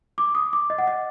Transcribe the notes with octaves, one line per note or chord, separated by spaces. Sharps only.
D6
D#6
D6
D#5
F#5
D#5